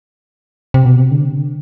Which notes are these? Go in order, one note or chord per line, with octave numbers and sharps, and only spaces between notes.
C3
B2
C3
D3
C3
D3